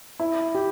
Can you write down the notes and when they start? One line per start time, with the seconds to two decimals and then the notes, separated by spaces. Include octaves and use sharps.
0.19 E4
0.55 G4